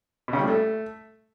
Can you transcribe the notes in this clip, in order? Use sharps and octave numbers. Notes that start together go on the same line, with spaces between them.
B2
C#3
G3
A2
A3